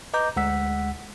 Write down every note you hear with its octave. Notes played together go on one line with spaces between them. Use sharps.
B4 D#5 A#5 D6 G6
D2 G#3 F#5 E6 B6